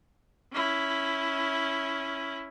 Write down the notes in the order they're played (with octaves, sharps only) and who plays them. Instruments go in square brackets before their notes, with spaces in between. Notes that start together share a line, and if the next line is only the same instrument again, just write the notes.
[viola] C#4 E4